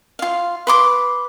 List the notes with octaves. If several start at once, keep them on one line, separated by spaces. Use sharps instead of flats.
F4 F5
B4 C6 D6